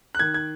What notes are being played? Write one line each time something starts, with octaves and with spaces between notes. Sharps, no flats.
F#6
D#3 G#6
G#6